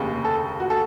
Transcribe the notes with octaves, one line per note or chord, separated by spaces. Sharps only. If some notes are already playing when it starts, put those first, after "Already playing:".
Already playing: F1 D#2 C#3
A4
F#4
A4